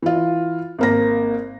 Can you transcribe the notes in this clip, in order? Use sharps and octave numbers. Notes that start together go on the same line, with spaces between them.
E3 F4
G#1 A#3 A#6